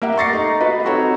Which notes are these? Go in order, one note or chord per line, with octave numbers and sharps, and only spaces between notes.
A#3 G4 E5 F#5
C#6 D6 A6 A#6 C7 C#7
A3 D#4
F#4 B4 D#5 B5
C4 D#4 F#4 A4 C#5